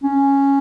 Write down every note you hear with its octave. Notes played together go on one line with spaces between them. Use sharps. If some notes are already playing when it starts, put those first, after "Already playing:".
C#4